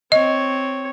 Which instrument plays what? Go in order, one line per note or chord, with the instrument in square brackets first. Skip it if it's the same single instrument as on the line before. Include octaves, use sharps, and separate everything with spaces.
[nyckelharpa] C4 C#5 [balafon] D#5